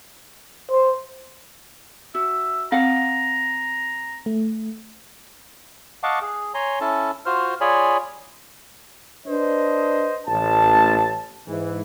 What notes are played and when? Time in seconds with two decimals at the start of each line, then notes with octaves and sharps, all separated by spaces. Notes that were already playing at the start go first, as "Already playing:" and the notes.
0.71 C5
2.15 F#4 E5
2.72 C4 F5 F#5 A#5
4.26 A3
6.03 D#5 F5 F#5 A5 C#6 D6
6.22 G#4
6.54 C#5 G#5 A#5 C6
6.81 C#4 E4 A4 A5
7.26 F4 F#4 C5 F6
7.61 F4 G#4 C#5 D5 G#5 B5
9.26 D4 B4 C5 D#5
10.26 A1 A5
11.47 G#2 E3